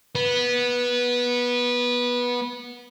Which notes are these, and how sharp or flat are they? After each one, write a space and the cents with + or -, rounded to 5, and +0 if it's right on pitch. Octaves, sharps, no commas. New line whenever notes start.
B3 -15